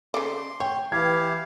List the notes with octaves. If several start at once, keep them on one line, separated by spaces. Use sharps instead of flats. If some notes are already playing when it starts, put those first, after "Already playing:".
C#3 A4 D5 C6
C#5 G5
E3 E4 G4 F5 G#6